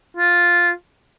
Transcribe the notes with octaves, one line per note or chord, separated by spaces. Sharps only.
F4